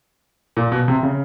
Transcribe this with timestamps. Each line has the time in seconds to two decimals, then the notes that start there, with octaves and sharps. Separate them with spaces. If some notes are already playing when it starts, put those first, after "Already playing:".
0.57 A#2
0.72 B2
0.88 C3
1.03 C#3